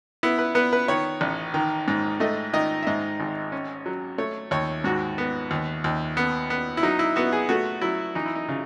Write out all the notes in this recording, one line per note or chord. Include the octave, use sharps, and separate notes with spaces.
B3 E4
B4
B3 B4
B4
D#3 C#5
A1
D#3
G#2
A3 D#5
D#3 D#5
E5
G#2 D#5
G#1
C#4
F#3
A3 C#5
D#2 C#5
G#2 F#4
B3
D#2
D#2
B3
B3
E4
F#3 D#4
E4
B3 F#4
G#4
A3 F#4
F#3 E4
E3 D#4
E4
D#4
C#3